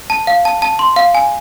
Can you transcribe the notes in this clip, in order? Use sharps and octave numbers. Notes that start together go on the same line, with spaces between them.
A5
F5
A5
A5
C6
F5
G#5